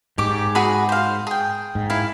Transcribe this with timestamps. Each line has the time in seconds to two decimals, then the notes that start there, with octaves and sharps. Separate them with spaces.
0.18 G#2 G4 D6
0.55 F#4 G#4 B5
0.89 C5 F5
1.27 G#4 G5
1.75 G#2
1.90 E4 F5